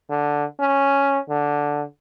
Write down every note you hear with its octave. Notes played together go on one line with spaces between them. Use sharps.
D3
C#4
D3